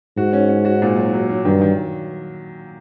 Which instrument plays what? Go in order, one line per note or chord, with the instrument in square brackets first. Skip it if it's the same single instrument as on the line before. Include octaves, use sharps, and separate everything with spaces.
[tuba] G#2 [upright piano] F#4
[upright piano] C#4
C#4
F#4
A#2
F#3
F#3
F#3
[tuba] G2 [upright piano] D#3
[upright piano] D#3